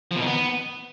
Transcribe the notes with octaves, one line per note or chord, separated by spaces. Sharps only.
F3
B2
D#3
B3